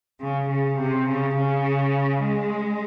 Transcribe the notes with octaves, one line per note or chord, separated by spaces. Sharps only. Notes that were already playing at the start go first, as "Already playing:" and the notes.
C#3
C#3
C3
C#3
C#3
G#3